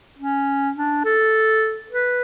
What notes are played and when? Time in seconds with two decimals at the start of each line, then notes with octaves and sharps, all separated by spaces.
0.19 C#4
0.76 D4
1.05 A4
1.91 B4